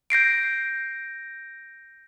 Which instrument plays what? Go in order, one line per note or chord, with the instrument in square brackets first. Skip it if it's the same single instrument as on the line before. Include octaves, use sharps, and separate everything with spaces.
[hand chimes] G6 A#6 C7 D7